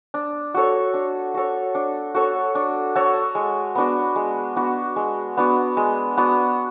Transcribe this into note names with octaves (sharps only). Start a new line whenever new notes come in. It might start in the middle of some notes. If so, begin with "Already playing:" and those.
D4
F#4 A4 C#5
D4
F#4 A4 C#5
D4
F#4 A4 C#5
D4
F#4 A4 C#5
G#3
B3 D4 F#4
G#3
B3 D4 F#4
G#3
B3 D4 F#4
G#3
B3 D4 F#4